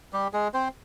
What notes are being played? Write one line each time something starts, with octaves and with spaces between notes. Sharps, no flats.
G3 G4
G#3 G#4
C4 C5